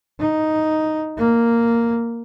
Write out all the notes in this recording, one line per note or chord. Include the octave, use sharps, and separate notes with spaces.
D#4
A#3